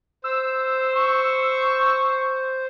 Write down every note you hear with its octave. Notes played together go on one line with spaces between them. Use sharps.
C5 E6
C#6